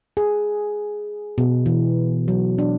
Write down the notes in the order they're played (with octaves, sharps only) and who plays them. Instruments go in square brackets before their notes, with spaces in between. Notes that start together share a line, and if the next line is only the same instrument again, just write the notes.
[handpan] G#4
B2
E3
F#3
D4